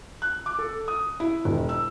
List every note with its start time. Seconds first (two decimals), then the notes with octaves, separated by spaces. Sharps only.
0.22 F#6
0.46 D6
0.59 A4
0.88 D#6
1.20 E4
1.45 E1
1.69 E6